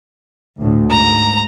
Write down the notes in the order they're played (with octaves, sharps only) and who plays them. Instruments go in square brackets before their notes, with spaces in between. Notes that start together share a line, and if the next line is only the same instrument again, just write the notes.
[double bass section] D2 A2
[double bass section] G#2 [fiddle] A#5